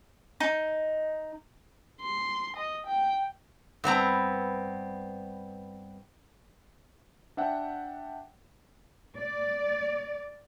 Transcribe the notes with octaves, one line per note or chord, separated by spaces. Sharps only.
D#4
C6
D#5
G5
G2 B3 C4 A#5
D4 E5 F#5 G5
D5